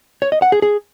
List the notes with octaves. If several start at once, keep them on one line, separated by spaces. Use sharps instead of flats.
C#5
D#5
F#5
G#4
G#4